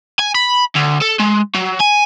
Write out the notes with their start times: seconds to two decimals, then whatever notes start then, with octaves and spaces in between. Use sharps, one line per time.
0.19 G#5
0.35 B5
0.76 D2
1.02 A4
1.20 G#3
1.54 F#3
1.80 G#5